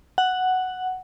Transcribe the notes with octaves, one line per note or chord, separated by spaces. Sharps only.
F#5